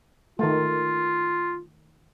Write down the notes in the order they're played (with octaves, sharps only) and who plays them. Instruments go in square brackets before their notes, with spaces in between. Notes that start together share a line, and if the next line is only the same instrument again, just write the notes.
[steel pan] D#3 A3 [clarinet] F4